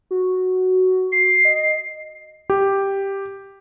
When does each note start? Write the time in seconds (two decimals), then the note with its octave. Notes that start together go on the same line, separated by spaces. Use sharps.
0.11 F#4
1.12 C7
1.45 D#5
2.50 G4